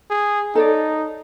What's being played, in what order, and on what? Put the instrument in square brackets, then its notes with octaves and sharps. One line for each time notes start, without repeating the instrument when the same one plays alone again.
[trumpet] G#4
[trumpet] D#4 [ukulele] A4 C#5 D5